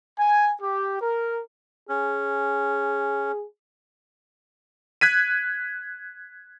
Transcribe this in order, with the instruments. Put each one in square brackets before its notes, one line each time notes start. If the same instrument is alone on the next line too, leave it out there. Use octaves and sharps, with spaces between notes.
[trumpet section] G#5
G4
A#4
[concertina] C#4 [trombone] G#4
[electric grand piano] F#6 G#6 B6 D#7